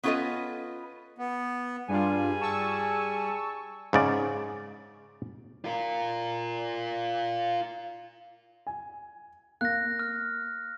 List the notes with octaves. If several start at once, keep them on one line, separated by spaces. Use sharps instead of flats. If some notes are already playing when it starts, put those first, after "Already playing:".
B3 C#4 F4 A4 B4 D#5
B3
G2 G3 D4 F4 G#4 G#5
A5 C#6 E6
G#2 C#3 D5
F4 A#4
G#5
A#3 F5 F#6 A#6
F6